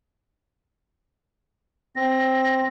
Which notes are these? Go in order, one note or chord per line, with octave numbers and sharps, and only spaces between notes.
C4 A#6